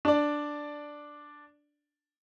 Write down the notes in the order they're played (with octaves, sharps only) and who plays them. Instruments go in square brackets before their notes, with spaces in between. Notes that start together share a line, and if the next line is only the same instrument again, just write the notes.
[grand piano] D4 D5